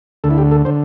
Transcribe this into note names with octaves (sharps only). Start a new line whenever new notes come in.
D2 D3 A4
E4
G4
A4
D3 C5